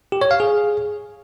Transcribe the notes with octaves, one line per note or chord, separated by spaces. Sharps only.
G4
C#5
F5
G#4